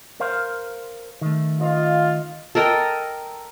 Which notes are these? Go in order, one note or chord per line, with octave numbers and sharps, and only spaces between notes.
A#4 C5 F5
D#3 A3
F4 D#5 F5
A4 A#4 D#5 G5